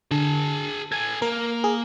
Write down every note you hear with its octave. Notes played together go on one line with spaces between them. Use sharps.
D3 G#4 A5
A4 G#5 G#6
A#3 A#4
G#4